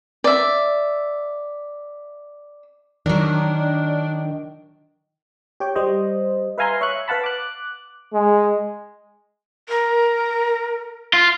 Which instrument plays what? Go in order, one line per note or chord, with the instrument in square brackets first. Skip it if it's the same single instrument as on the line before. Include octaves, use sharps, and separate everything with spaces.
[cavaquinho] D5 E5
[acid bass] D#3 [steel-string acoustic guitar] F#3 A#4 [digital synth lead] D4
[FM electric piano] G4 C#5 G5
G3 C5 D#5
B4 E5 F5 G#5 A#5 C6
C#5 E5 C#6 F#6
B4 F5 F#5 A5 B5
D6 F#6
[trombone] G#3
[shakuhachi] A#4
[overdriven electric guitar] F4